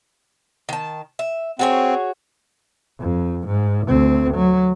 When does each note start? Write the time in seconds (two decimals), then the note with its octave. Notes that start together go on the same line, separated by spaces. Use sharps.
0.69 D#3 A5
1.19 E5
1.59 C4 F#4 G#4 C#5
3.00 F2
3.47 G#2
3.88 D2 C4
4.34 F#3